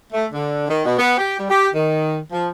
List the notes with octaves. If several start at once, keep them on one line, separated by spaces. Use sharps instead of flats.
A3
D3
D#3
B2
B3
G4
G3
G4
D#3
F3